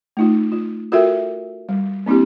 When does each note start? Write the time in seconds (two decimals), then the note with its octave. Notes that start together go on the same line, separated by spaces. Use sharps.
0.17 A3 D#4 F4
0.52 F4
0.92 F4 F#4 A4 A#4 E5 G5
1.69 G3
2.06 A#3 C4 D4 E4 G4